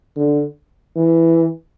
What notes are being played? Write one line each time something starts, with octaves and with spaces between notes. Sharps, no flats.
D3
E3